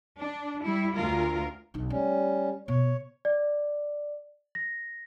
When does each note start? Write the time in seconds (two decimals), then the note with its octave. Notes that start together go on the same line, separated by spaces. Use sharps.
0.20 D4
0.63 G3 E4
0.97 D2 F4 A#4
1.74 B1 D#4
1.90 G3 A3 C#4
2.68 B2 C#5
3.25 D5
4.55 A#6